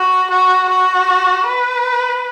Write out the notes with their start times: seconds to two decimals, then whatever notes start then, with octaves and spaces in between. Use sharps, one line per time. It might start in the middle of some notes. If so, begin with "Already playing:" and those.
Already playing: F#4
0.30 F#4
0.69 F#4
1.46 B4